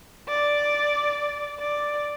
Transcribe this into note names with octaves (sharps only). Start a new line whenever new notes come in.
D5
D5